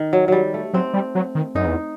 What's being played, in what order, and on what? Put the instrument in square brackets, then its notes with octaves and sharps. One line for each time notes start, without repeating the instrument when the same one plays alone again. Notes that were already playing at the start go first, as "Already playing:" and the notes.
Already playing: [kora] D#3
F#3
F#3 G3
A3
[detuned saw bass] F#3 [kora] C4
[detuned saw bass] G3
F#3
D#3
[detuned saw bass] F#2 [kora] D#4
[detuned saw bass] E2